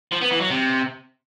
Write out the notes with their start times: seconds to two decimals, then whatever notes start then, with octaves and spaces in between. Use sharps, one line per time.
0.12 F3
0.21 B3
0.31 E3
0.40 F#3
0.50 C3